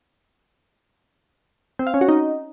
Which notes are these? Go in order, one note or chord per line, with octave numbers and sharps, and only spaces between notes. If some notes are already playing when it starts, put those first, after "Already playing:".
C4
F5
C#4
F#4
D#4